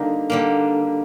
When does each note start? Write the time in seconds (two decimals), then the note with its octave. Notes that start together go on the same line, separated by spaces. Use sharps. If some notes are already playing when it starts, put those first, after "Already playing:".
Already playing: D3 G3 A#3 D#4
0.30 D3 G3 A#3